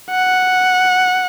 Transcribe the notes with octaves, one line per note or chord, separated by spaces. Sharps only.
F#5